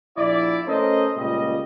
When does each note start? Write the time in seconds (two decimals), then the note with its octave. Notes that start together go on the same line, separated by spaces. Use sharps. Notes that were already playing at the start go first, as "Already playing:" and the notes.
0.16 A#1 E4 D5
0.67 A3 C#4 A4 A#4 C5 D#5
1.17 C#2 A#2 G3 D#5